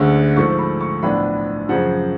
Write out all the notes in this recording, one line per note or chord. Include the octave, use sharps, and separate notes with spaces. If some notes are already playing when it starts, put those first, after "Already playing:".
Already playing: D2 D3 G#3 C#4
G#2 F3 A3 C#6
B5
C#6
B1 A2 F3 B3 D4 B5
F#2 C#3 F3 F#5